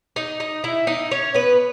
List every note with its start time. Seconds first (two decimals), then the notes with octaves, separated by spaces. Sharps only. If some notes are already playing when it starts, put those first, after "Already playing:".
0.16 D#4 D#5
0.40 D#4 D#5
0.64 E4 E5
0.87 D#4 D#5
1.11 C#4 C#5
1.34 B3 B4